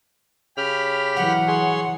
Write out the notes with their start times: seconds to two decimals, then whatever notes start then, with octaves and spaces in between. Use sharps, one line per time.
0.57 C#3 G4 B5 F6
1.16 E3 F#3 F#5
1.48 G#4 C#5 C6